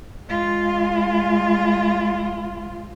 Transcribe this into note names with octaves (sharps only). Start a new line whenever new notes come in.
G#3 F4